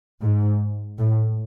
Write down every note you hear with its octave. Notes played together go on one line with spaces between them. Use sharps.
G#2
A2